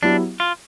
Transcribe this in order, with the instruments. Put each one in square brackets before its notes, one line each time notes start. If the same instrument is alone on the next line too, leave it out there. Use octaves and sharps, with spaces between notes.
[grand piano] F#3 B3 E4 G4 [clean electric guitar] D4
[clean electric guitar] F4